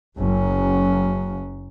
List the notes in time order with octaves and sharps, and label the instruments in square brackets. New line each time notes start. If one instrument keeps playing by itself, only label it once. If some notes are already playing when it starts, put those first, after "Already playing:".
[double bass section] F#1 [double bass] F#3 C#4